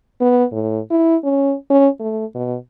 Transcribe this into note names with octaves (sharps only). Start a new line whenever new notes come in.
B3
A2
E4
C#4
C#4
A3
B2